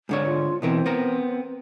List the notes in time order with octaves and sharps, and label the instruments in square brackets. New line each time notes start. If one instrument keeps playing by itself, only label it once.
[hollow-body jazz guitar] G#2 D3 C#5
[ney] F4
[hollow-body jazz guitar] B2 E3 A#4 [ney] C4
[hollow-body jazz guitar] B3 A#4 A#5